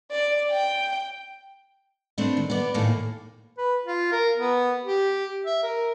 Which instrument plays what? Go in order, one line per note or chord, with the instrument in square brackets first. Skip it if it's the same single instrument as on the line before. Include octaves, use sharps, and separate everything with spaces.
[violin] D5
G5
[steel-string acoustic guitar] A3 B3 C4 D4 C5
D#3
B3 D5
D#2 A2 A#3 A4 G#5
[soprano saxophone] B4
F4
A#4
B3
G4
E5
A#4